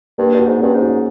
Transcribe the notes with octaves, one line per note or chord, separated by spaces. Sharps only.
G2 A#3
G2 F#4
G#2
G2 C#4
G#2
F#4